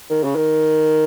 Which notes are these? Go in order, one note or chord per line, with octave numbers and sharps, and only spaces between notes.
D#3
C#3
D#3